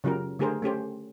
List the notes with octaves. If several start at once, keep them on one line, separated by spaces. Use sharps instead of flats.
C#3 F#3 F4 G4 A#4
D3 A3 G4 G#4 A#4 C5
A3 C#4 G4 C5